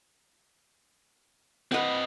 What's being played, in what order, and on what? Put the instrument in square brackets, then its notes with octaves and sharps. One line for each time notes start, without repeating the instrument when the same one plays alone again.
[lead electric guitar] C4 D#5 [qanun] B4 F#5